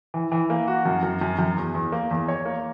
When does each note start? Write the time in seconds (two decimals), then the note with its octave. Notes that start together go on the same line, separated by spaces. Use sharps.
0.14 E3
0.32 E3
0.50 A#3
0.68 F#4
0.85 F#2
1.03 F#2
1.21 F#2
1.39 F#2
1.56 E2
1.74 E2
1.92 A#3
2.11 E2
2.28 C#5
2.45 A#3